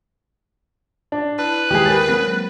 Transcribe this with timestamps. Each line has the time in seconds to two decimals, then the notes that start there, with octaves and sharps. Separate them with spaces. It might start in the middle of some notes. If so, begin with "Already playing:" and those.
1.12 D4
1.39 E4 B4 A5
1.71 D#2 G#3 G4 G#4
1.86 A#4 C#5 A6
2.09 F#3 G#3 A#3 C4